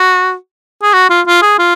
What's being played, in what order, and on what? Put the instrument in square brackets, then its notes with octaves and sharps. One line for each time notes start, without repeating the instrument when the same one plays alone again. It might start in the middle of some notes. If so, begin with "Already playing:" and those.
Already playing: [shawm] F#4
G#4
F#4
F4
F4
G#4
F4